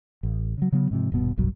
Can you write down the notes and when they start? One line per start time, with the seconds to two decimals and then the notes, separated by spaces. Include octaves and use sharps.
0.23 A1
0.57 C#3 F#3
0.72 C#3 F#3 B3
0.91 G#2 C3 F3
1.12 D#1 G2 B2 B3
1.38 F1 B1 G2 F#3